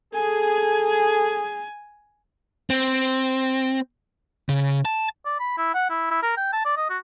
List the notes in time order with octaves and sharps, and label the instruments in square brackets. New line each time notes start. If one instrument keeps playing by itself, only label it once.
[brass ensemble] G#4 [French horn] A4 [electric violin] G#5
[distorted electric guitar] C4
C#3
A5
[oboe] D5
B5
E4
F#5
E4
E4
A#4
G5
A5
D5
D#5
F#4